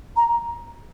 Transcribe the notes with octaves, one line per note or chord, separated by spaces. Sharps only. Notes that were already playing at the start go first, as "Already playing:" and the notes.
A#5